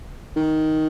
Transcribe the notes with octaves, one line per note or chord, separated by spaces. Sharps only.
D#3